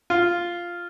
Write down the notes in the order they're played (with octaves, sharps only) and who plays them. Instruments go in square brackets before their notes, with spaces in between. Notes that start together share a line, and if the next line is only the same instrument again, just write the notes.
[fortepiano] F4